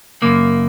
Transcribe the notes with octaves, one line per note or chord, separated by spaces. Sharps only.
F#2 C#3 A#3